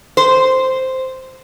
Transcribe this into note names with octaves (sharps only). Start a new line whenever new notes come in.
C5